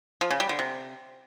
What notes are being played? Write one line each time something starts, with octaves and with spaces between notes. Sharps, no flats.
F3
C#3
G3
D3
C3